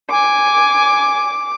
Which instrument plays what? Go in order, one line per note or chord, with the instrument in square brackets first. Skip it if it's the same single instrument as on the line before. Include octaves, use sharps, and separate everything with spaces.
[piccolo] G#5 [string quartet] D6